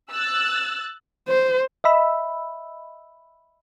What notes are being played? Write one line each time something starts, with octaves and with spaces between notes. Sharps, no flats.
E6 F#6 A6
C5
D#5 E5 B5 E6